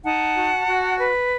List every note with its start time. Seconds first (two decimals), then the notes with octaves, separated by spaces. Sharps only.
0.03 D#4 F#5 A5
0.34 F#4
0.66 F#4
0.98 B4